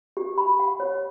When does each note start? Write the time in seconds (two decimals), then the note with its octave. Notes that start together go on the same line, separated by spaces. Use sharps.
0.17 G4
0.38 B5
0.59 F#5
0.80 C#5